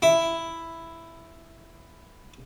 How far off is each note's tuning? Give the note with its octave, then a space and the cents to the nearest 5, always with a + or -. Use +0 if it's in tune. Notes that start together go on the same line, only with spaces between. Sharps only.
E4 +5